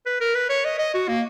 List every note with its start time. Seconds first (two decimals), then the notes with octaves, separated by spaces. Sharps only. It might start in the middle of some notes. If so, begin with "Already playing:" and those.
0.06 B4
0.21 A#4
0.35 B4
0.50 C#5
0.65 D#5
0.79 D#5
0.94 F#4
1.08 A#3